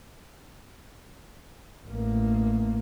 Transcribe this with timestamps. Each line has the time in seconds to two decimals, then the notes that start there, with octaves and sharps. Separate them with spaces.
1.88 A1 A#3